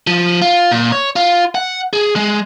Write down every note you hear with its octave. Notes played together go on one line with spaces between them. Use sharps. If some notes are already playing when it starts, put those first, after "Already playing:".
F3
F4
A#2
C#5
F4
F#5
G#4
G#3